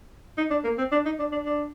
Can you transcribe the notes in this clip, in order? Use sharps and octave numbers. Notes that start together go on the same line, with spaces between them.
D#4
D4
A#3
C4
D4
D#4
D4
D4
D4